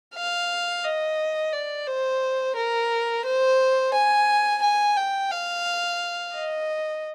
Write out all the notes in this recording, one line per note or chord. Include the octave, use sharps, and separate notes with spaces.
F5
D#5
D5
C5
A#4
C5
G#5
G#5
G5
F5
D#5